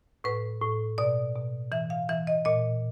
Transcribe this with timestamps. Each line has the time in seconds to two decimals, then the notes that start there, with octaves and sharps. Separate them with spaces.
0.24 A2 B4
0.61 A2
0.98 B2 D5
1.35 B2
1.72 E3 E5
1.90 F5
2.09 E3 E5
2.27 D#5
2.45 A#2 D#5